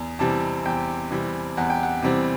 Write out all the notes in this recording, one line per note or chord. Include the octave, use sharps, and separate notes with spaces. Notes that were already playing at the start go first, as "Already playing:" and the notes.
Already playing: E2
C3 E3 G3 C4 A5
E2 G5
C3 E3 G3 C4
E2 F#5
G5
F#5
C3 E3 G3 C4